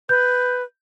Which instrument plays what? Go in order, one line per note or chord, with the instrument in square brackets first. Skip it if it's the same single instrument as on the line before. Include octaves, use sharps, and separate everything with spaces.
[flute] B4 [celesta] G6